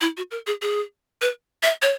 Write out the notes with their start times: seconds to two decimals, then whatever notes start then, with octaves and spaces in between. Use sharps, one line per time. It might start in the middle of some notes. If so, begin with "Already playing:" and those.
0.01 E4
0.17 F#4
0.31 A#4
0.47 G#4
0.62 G#4
1.22 B4
1.63 E5
1.82 C#5